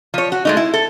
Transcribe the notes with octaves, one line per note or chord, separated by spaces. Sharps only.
F3 C#5
F#4
G#3 A3 D#4
E4
A4